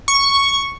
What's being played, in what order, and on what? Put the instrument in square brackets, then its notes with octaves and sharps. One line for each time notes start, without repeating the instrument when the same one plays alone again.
[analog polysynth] C#6